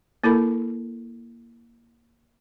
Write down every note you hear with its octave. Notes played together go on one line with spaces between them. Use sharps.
A#3 E4 A4 A#4 B5